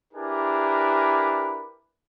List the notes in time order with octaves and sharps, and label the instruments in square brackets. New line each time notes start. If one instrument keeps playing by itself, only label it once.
[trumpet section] D4 E4 G4 G#4 A#4 B4